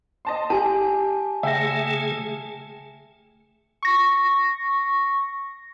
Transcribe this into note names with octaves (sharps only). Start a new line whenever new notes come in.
D#5 A5 C6
G4 G#5 A5
C#3 A3 G#4 E5 G5 A#6
C#6 A#6